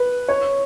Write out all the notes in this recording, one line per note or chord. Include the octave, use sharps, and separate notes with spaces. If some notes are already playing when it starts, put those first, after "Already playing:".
Already playing: B4
C#5